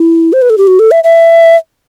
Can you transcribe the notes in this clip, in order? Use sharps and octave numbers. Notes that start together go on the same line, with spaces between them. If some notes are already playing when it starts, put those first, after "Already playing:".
Already playing: E4
C5
B4
A4
G4
F#4
A4
E5
E5